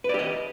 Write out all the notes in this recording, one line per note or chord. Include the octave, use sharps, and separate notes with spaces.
G4 B4 D5 D#5